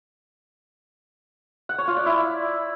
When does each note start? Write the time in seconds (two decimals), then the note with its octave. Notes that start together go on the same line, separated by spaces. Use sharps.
1.69 F#5
1.78 C#5
1.88 F4
1.97 D5
2.06 E4